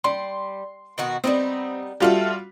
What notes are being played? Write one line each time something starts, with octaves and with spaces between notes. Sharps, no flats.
G3 C6
B2 D#3 F#4
G3 B3 C4 D#4
G3 A3 F4 F#4 A4 G5